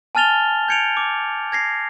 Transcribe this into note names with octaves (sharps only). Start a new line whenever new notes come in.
G#5 A5 F6 A6 F7 G7
G6 G#6 C#7 D7 F7
D6
G#6 A#6 C7